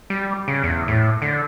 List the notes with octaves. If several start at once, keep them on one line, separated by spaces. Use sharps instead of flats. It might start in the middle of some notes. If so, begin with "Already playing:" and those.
G3
C#3
E2
A2
D3